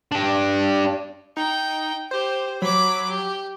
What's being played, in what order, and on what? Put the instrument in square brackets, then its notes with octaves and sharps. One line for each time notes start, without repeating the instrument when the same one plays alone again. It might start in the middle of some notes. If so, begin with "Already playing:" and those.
[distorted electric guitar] D4 G4
[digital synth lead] D#4 [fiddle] G5
[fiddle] G4 [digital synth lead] C5
[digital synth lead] F#3 [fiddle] B5 D6
[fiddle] G4